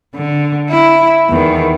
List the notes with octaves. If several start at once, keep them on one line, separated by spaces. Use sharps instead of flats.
D3
E4
E2 D#3